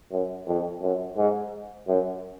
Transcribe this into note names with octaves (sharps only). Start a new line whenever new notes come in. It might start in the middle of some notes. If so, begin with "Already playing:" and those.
F#2
F2
F#2
G#2
F#2